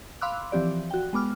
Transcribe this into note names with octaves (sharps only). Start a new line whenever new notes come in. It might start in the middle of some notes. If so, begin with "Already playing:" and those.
F5 B5 C6 D6 E6 F#6
E3 F3 C4 G4 D5
F#4 G5
G#3 B3 D6 F6